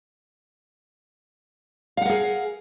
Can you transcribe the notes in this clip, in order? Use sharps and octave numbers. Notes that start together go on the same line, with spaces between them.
G#4 A#4 F5 F#5